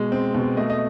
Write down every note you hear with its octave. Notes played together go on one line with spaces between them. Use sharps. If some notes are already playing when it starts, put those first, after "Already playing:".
Already playing: B2 G#3
C4
B2
A3 D#5
D#5